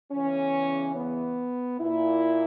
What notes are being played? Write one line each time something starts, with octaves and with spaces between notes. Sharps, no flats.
E2 C#3 E3 C#4
B3
A#2 E4